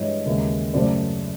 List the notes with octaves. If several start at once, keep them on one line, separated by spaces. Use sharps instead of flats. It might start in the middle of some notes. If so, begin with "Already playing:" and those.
Already playing: G2 E3 G#3 C#5 D#5
D#2 C#3 E3 G#3
F#2 C#3 F#3 A3 C5 D5